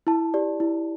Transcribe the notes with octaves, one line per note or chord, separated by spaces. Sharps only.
E4 A5
G4 D5
E4